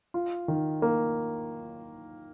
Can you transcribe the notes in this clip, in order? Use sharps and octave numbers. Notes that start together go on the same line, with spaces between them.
F4
D#3
A#3